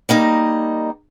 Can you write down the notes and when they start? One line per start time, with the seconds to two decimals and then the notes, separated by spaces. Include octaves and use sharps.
0.09 G3 A#3 D#4 D#5